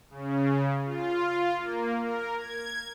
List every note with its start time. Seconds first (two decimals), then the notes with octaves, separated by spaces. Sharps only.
0.10 C#3
0.85 F4
1.56 A#3
2.02 A#4
2.37 G#6